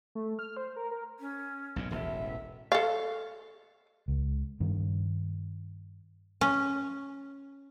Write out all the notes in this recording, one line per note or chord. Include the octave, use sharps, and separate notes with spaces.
A3
F6
C5
A#4
A#4
C#4
B1 G2 A#2
E1 A1 E5
A4 F5
C#2
G2 D#3
C#4